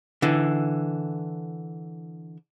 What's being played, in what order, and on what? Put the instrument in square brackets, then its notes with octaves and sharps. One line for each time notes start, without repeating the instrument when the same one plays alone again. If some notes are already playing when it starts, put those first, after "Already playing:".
[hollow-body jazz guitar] D3 E3